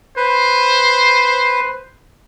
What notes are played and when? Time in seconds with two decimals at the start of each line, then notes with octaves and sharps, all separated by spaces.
0.17 B4 C5